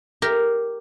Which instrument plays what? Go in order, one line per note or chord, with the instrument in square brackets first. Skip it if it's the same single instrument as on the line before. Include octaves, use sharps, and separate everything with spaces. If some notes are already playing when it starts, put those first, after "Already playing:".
[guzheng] G4 A#4